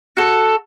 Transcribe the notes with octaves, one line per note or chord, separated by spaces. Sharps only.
F#4 A4